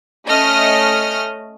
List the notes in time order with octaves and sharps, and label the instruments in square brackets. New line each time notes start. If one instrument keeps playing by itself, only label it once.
[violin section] A3 C#4 D#5 F6